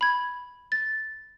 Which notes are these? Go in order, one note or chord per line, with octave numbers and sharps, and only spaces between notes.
B5 G#6
A6